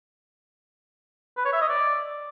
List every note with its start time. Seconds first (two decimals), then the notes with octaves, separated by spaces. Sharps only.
1.37 B4
1.45 C#5
1.53 E5
1.61 D#5
1.69 D5